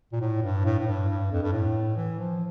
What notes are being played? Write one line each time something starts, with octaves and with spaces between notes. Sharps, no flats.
A#2
A2
G2
A2
A2
G2
G2
F2
G2
A2
E3
F3